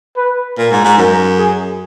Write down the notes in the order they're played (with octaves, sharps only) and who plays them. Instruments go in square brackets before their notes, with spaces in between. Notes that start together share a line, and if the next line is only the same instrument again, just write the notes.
[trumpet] B4
[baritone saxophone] A#2 [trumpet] A#4
[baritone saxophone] G#2
G#2
[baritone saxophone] F#2 [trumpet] A#4
[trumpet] G#4